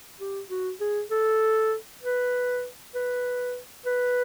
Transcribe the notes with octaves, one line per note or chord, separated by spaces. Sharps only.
G4
F#4
G#4
A4
B4
B4
B4